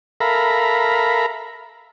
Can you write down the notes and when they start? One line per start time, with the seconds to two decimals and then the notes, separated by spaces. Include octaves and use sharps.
0.20 A4 A#4 E5 F5 A#5 B5